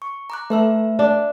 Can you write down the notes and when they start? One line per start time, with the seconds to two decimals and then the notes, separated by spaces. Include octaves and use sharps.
0.02 C#6
0.30 A#5 D6 F#6
0.50 A3 B4 E5 E6
0.99 D4